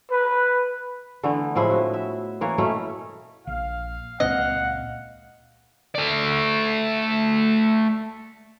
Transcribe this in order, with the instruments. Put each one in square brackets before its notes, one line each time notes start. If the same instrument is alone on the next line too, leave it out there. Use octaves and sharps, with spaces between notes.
[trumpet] B4
[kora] D3 E3 A3 B3
A2 F3 G#3 E4
F#4
E5
E3 A#3 B4 C#5
B2 A3 C#4 E4
[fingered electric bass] A#1 [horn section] F5
[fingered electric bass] C#2 A#2 C4 [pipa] D#5 [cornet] F#5
[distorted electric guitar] A3 D5